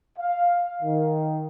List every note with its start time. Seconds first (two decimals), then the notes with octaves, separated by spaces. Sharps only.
0.19 F5
0.82 D#3